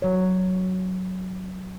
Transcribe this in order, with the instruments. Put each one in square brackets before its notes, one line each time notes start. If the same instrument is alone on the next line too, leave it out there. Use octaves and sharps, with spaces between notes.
[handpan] F#3 C#5